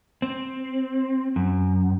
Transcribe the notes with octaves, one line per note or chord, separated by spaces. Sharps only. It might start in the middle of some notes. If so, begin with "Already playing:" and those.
C4
F#2